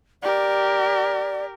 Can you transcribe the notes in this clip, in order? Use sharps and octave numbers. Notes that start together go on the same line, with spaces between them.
G4 A#4 D5